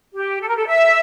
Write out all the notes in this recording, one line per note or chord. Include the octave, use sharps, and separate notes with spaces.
G4
A4
A#4
A4
E5